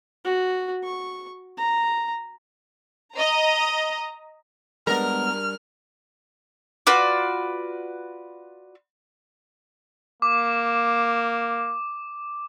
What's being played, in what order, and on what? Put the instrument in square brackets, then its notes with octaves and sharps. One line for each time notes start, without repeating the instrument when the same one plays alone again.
[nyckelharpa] F#4
C#6
A#5
[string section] D#5 A#5
[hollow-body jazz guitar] G3 D4 [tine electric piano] G#3 B3 [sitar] A#4 [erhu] F6
[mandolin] F4 F#4 B4 D5
[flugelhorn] A#3 [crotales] D6